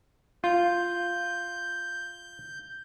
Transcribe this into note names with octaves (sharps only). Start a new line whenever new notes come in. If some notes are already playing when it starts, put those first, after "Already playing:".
F4 G6